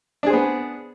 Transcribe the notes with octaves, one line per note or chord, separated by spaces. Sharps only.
B3 D4 G#4 C5